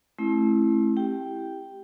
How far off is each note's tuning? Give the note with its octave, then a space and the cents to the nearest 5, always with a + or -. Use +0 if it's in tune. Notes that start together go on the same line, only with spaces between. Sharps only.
A3 -30 C4 +40 E4 +10
G4 +0 G5 +0